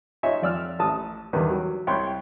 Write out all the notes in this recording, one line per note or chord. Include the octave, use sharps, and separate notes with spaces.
D#4 F4 C#5 E5 G#5
F2 D5 E6 F6
A1 A4 A5 D#6
E2 D3 D#3 G3 B4
F#3
C2 C#5 G5 B5 C6 F#6